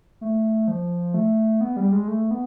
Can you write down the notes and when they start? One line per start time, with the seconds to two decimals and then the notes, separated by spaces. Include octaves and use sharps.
0.21 A3
0.68 F3
1.14 A3
1.61 B3
1.76 G3
1.92 G#3
2.08 A3
2.31 B3